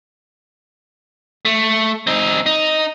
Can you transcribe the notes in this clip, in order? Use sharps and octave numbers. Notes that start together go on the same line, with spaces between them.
A3
C4 D#4
D#4